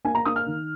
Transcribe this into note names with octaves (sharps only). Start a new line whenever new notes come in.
A#3 G#5
A#5
A#3 D#6
F6
D#3